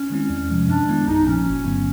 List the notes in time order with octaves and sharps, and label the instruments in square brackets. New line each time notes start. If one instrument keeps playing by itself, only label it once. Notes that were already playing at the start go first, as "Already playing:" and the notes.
Already playing: [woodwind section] C#4
[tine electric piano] D#3 G#3 C4 E4
E2
C3 F3 G#3
[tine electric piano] F#2 [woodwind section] D4
[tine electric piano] D#3 G#3 B3 E4
[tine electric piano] A#1 [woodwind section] D#4
[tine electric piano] A#2 F3 A#3 [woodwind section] C#4
[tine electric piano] G1
G2 D3 F#3 B3